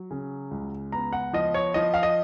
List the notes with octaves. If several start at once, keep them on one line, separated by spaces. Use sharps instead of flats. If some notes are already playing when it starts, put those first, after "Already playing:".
Already playing: F#3
C#3
C#2
B3 A#5
F#5
F3 D#5
C#5
F3 D#5
F5
D#5